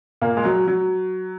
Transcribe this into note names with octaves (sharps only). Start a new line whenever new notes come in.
A#2 A#3
G#3
F#3
F#3